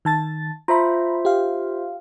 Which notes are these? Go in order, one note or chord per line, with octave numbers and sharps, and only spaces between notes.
D#3 A5 A6
F4 C5 E5 A#5 B5
G4 F5